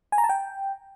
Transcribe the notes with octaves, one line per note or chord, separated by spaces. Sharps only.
G#5
A#5
A5
G5